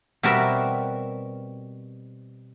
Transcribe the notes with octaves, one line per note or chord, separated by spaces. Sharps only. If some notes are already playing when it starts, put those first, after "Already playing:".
B2 G3 C4 F#4 A#4 E5